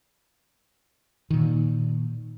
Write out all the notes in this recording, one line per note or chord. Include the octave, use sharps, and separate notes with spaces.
A#2 D#3